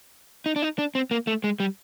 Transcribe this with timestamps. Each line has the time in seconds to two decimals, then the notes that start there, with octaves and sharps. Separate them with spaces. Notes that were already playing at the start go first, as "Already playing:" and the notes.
0.46 D#4
0.56 D4
0.62 D#4
0.78 D4
0.95 C4
1.11 A#3
1.27 A3
1.44 G#3
1.60 G3